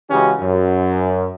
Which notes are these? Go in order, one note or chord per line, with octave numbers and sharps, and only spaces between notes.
C#3 E3 G#3 C#4 F#4 G4
F#2